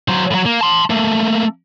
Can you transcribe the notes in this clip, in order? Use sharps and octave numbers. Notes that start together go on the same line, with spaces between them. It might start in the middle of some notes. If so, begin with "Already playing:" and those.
F#3 C5
A2 F#3
A#3
A5 C6
A3 A#3